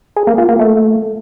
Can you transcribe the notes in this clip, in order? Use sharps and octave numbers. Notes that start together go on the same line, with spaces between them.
G#4
A#3
F4
A#3
A3